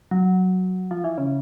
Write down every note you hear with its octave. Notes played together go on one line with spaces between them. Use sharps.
F#3
F3
E3
C#3